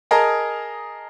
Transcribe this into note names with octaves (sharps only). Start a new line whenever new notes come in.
G#4 A#4 D#5 A5 A#5